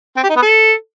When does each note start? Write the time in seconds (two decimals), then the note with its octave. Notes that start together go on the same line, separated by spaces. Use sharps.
0.17 C4
0.23 G4
0.29 D#4
0.36 B3
0.42 A4